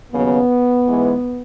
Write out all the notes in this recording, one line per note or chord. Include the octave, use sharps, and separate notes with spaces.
D#2 C#3 F#3 B3
G#2 E3 G#3